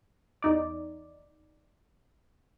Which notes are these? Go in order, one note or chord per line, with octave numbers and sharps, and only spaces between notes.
E2 D#4 D5